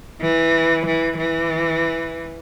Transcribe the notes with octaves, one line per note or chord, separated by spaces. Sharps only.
E3
E3
E3